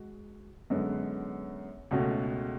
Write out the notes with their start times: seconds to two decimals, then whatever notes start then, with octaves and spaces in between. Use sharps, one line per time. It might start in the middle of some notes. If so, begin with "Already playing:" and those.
Already playing: G#3 F#4
0.70 F#2 D3 G#3 B3
1.91 C#2 B2 A3 C#4 F#4